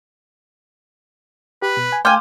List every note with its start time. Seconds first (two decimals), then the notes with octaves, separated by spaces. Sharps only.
1.62 G4 B4
1.77 B2
1.92 G#5
2.05 A3 F5 G5 G#5 C6 D6 F6